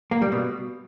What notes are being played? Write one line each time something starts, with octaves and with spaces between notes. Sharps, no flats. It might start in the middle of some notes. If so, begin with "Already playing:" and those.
A#3
G3
B2